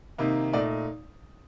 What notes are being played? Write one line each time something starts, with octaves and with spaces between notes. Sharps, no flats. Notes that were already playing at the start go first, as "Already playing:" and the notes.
C3 D#3 A#3 D#4
A#2 A3 D#4 D5